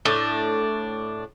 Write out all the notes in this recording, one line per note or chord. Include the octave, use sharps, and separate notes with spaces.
A2 D4